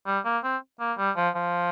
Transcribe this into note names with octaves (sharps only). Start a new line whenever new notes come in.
G3
A#3
C4
A#3
G3
F3
F3